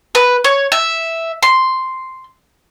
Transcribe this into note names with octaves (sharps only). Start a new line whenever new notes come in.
B4
C#5
E5
C6